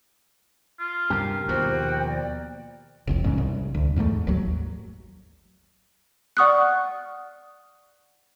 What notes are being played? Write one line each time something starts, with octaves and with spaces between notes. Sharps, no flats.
F4
G2 C3 G4 A#4
D#2 B2 F3 F#4 C5 G5
D5
F1 C2 F2
A1 G#2 C#3
C2
D2
E2 G#2 C3 A3
G#1 D#2 F#3
D5 F#5 C#6 D#6 F6 F#6